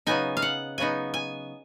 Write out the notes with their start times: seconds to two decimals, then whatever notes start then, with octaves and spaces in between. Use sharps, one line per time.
0.06 C#3 F#3 B3 D#4 G#5
0.37 F5
0.42 F#5
0.78 C#3 F#3 B3 D#4 G#5
1.14 G#5